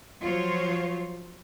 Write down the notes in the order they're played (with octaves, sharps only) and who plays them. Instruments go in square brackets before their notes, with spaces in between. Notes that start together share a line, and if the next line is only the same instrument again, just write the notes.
[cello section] F3 F#3 F4 C5 C#5